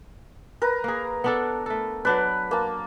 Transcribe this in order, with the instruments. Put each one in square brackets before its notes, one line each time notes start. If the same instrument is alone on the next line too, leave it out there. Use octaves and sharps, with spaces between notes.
[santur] A#4 B4
[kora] A#3 G#4
B3 D4 A4
A3 A4
[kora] F#3 D4 D5 [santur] B4
[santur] A#3 A5